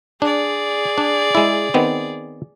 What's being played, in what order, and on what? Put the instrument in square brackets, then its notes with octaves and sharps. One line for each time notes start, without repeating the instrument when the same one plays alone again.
[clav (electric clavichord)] D4 [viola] G#4 D5
[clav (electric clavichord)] D4
G#3 E4
D#3 B3 C4